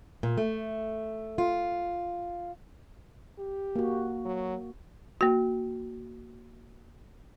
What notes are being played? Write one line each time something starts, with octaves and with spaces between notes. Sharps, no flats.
A#2
A3
F4
G4
A#3 F#4
F#3
A#3 F#4